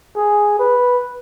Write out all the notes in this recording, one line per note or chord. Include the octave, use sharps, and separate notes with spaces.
G#4
B4